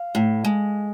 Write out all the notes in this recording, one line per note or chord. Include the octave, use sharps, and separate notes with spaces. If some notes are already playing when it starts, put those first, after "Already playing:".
Already playing: F5
A2
G#3